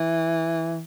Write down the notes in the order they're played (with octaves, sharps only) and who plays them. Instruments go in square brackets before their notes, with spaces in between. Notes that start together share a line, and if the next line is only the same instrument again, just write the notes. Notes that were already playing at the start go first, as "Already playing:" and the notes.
Already playing: [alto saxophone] E3